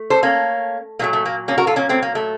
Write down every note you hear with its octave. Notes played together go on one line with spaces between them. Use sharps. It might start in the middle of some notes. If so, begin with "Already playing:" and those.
Already playing: A3
A4 C5
A#3 C#4
A#2 F#3 A3 A#3
A3
A#3
A#3 C#4
F#4 A#4
F4 A4
A#3 C#4
A3 C4
A#3
A3